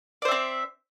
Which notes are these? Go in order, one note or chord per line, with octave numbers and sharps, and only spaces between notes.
C4 C5 D5 E5